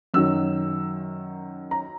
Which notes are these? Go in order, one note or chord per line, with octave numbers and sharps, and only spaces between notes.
F#2 D#3 F#3 E6
A#5